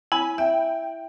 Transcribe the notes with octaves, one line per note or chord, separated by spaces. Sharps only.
E4 G#5 B5
E5 G5